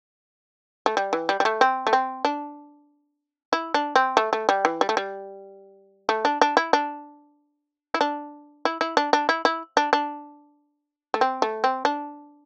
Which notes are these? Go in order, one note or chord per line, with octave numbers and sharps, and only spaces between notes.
A3
G3
E3
G3
G3
A3
C4
A3
C4
D4
E4
D4
C4
A3
A3
G3
E3
G3
A3
G3
A3
D4
D4
E4
D4
E4
D4
E4
E4
D4
D4
E4
E4
D4
D4
A3
C4
A3
C4
D4